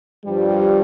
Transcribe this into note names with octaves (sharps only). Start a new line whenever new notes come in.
G2 F3 G3